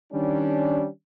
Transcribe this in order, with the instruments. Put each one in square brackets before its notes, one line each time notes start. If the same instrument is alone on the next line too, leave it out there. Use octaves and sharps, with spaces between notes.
[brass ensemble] D#3 G3 C#4 D4